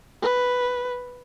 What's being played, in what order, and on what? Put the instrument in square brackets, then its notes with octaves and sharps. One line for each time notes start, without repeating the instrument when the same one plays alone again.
[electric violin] B4